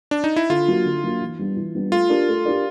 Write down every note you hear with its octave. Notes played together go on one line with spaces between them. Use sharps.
D4
D#4
E4
D3 F4
F#3 A#3 D4
D3
F#3 A#3 D4
E3
G3 B3 D4
E3
G3 B3 D4
A3 F4
D4 G4 A#4 D5
A3
D4 G4 A#4 D5